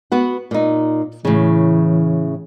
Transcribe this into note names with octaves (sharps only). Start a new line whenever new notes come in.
B3 F#4
A#2 D#4
A2 C#3 E3